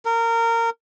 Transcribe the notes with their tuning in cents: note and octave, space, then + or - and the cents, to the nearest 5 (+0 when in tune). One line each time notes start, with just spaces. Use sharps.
A#4 -20